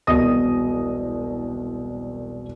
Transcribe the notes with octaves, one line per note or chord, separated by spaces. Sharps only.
E1 C2 B2 D#5 D#6 A#6